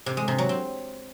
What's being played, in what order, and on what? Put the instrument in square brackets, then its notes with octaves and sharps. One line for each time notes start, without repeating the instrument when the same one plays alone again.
[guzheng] C3
G#3
C3
F#3
C4